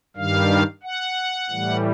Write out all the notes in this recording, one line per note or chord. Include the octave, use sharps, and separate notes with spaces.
G2 D#3 G3 F5
F#5
A2 E3 G3